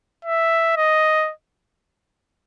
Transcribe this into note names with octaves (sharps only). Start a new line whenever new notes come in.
E5
D#5